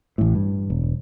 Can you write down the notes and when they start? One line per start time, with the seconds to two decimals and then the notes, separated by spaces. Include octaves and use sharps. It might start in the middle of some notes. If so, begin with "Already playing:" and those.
0.18 A1 A2
0.35 G2
0.70 E1